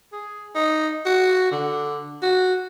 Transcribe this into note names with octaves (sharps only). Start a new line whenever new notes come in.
G#4
D#4
F#4
D3
F#4